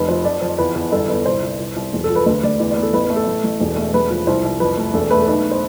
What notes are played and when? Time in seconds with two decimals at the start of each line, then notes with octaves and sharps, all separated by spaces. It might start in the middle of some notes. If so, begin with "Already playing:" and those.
Already playing: F1 B4
0.09 F3 C5
0.25 F2 D5
0.41 F2 C5
0.58 E2 B4
0.75 E2
0.92 G1 A4
1.09 G1 B4
1.26 C2 C5
1.43 C2
1.60 C2
1.76 C2
1.93 E1
2.04 A4
2.10 F3
2.16 B4
2.26 D2 B4
2.44 D2 D5
2.59 E2 D5
2.71 D5
2.77 B3
2.83 A4
2.93 A1 B4
3.04 B4
3.10 A3
3.16 A4
3.27 A1
3.44 A1
3.60 E1
3.76 A3
3.94 E1 B4
4.10 F3
4.27 C2 C5
4.44 C2
4.60 F2 B4
4.77 A3
4.94 E1 A4
5.11 A3 B4
5.21 A4
5.27 B1 B4
5.51 C5